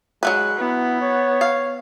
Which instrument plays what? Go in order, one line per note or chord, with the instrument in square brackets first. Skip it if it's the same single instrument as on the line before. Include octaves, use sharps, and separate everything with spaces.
[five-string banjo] F#3 A3 B4 [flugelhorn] G#3
[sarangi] B3 [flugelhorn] E4
[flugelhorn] C#5
[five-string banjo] F5